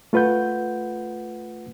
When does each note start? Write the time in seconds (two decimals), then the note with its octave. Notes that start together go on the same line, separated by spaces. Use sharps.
0.13 A3 F4 B4 F#5 G6